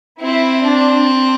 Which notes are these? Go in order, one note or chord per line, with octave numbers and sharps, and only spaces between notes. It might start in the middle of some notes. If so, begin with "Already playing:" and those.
C4 E4
D4
D4